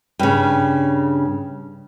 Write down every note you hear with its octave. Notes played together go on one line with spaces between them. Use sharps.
G2 C#3